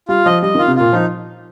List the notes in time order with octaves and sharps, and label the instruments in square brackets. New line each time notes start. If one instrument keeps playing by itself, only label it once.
[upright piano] G3 [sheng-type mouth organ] F4
[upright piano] F3 [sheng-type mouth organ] D#5
[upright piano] G3 [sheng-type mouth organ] D#5
[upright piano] D#3
[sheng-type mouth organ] F4
[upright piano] C3
[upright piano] A#2 [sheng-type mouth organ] F4
[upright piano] F3 [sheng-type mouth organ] D#4